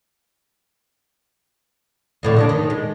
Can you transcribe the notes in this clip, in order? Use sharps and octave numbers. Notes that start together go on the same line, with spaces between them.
F2 A2 D3
G#3 C#4 D4
D#3
G#3